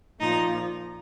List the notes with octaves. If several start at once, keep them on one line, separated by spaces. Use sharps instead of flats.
A#2 F3 D#4